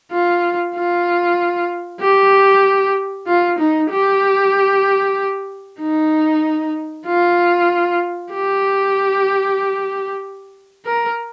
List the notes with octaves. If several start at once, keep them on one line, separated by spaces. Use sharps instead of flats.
F4
F4
G4
F4
D#4
G4
D#4
F4
G4
A#4